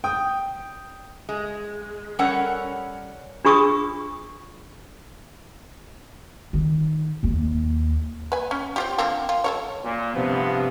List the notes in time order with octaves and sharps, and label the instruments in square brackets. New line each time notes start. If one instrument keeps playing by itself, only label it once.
[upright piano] G5 D#6
[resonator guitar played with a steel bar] G#3
G3 C#4 A4 A#4 C#5 F#5
[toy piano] D4 F4 G#4 C#6 D#6 E6
[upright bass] D#3 D#4
D#2 A#3
[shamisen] B4 G#5
C#4
C4 F4 G4
D3 A#3 C4
F4
A4 A#4 C#5
[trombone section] A#2
[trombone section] G2 F3 B3 [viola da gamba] C3